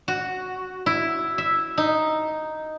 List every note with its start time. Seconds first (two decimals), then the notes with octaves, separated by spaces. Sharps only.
0.08 F#4
0.86 E4
1.38 E5
1.78 D#4